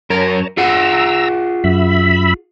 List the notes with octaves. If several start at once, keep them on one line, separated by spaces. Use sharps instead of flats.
F#2 A#4 C#5 A5 A#5
F4 G#4 F#5 A#5 E6
F#2 E5 B5